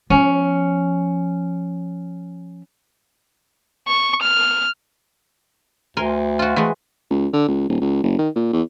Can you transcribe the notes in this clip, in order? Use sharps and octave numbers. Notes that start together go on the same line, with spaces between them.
F3 B3 C#4
C#6
F6
D2 A#4 G#5 C6
F4 F#4
E3 G#3 A3
C#2
D3
C#2
D#1
C#2
F#1
D#3
A#2
E2